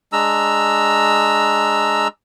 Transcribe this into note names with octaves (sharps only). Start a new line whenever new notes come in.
G#3 D4 A#5 E6